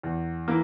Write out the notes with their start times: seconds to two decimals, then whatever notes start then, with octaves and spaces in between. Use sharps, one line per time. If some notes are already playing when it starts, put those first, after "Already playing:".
0.03 E2
0.48 E3 A#3